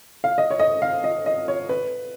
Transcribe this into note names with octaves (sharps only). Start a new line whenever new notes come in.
F5
D#5
C#5
D#5
F5
D#5
D#5
C#5
B4